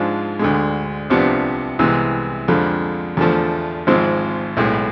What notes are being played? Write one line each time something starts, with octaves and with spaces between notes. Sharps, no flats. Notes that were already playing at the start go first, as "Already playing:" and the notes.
Already playing: G#2 F3 G#3 D4 F4
D2 D3 G#3
C2 C3 F3 B3 D4
C2 C3 E3 G#3 B3
F2 D3 F3 G#3
E2 D3 F3 A3
G#1 G#2 F3 G#3 C4
B1 A2 G#3 B3